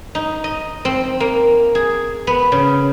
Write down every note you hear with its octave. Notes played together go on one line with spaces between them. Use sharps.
D#4
D#5
C4
A#3
G#4
B3
C#3